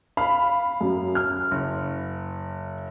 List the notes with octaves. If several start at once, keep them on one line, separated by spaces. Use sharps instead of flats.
F5 B5
F#2
F6
F#1